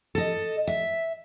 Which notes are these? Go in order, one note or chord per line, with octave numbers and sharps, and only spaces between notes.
A4 D#5
E5